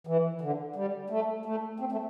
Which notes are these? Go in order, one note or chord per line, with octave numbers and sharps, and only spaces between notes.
E3
D3
G3
A3
A3
C4
A3